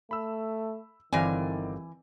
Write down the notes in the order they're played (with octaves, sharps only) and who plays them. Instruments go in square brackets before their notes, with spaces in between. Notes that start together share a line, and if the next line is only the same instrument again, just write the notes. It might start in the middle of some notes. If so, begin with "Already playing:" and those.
[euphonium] A3 [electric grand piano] B5 E6
[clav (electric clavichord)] G1 F5 [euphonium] D#3 [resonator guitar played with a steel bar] E3 G#5 [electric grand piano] C4 D5